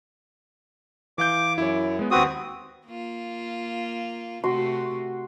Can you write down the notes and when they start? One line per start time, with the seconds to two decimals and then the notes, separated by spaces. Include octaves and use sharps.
1.18 E3 F5 D6 G6
1.58 F#2 E4 C#5
1.99 G#3 B3
2.11 D#2 C4 F#4 B4 C5 D#6
2.86 A#3 F4
4.44 C3 A3 F#4 C6